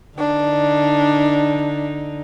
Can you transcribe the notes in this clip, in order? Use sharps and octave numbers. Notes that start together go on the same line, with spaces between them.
D3 D4 D#4